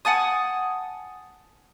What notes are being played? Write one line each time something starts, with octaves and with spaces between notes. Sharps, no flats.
F#5 G#5 A5 D#6